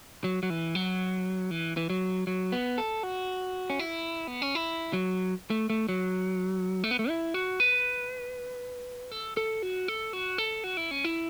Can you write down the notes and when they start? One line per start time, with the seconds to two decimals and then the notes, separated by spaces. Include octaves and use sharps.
0.24 F#3
0.43 F#3
0.50 E3
0.75 F#3
1.51 E3
1.77 E3
1.90 F#3
2.27 F#3
2.52 B3
2.78 A4
3.03 F#4
3.70 C#4
3.79 E4
4.27 B3
4.42 C#4
4.55 E4
4.93 F#3
5.50 A3
5.70 A3
5.89 F#3
6.84 A3
6.91 B3
6.99 A3
7.09 E4
7.34 F#4
7.60 B4
9.11 A4
9.37 A4
9.63 F#4
9.88 A4
10.13 F#4
10.38 A4
10.64 F#4
10.77 E4
10.91 C#4
11.04 E4